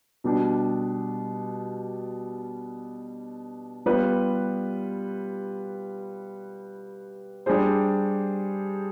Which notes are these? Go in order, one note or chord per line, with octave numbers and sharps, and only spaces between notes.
B2 G3 D4
G3 B3 F4 B4
G3 D4 G#4 C5